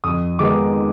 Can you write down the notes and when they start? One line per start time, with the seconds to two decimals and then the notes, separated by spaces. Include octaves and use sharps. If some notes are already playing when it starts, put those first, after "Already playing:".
0.04 F2 D#6
0.39 D#3 G#3 B3 D#4 D6